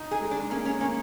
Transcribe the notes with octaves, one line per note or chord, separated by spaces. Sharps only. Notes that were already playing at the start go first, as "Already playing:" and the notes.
Already playing: D#4
G#4
G#3
D4
A#3 C#4
C#4
A#3 C#4